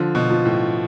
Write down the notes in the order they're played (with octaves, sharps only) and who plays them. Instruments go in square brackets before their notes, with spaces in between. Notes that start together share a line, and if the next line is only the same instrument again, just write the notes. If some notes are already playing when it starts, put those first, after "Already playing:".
Already playing: [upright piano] D3 [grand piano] F3
[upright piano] B2
[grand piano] F3
[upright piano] A2